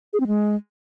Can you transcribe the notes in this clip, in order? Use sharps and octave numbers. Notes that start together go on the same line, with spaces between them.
G#4
C4
G#3